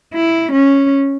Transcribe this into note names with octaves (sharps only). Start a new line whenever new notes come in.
E4
C#4